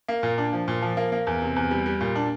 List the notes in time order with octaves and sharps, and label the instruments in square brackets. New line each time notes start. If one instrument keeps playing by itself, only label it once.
[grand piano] A#3
A#2
D4
F3
A#2
F3
A#3
A#3
E2
C3
E2
G3
G3
A#2
D4